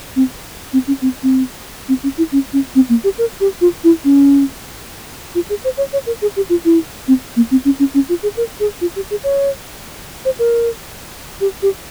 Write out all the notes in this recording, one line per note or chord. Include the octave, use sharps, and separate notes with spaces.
C4
C4
C#4
C4
C4
C4
C#4
E4
C#4
C#4
C4
A#3
G4
A#4
G4
F4
E4
C#4
F4
G#4
C5
C#5
C#5
A#4
G#4
G4
F4
E4
C4
A#3
C4
C#4
C#4
C#4
F4
G#4
A#4
G#4
F4
G4
G#4
C#5
C5
A#4
G4
G4